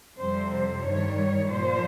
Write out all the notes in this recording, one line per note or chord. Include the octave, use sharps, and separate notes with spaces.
F2 C3 G3 C5
C5
G2 D#3 G3 C#5
A#2 F3 C5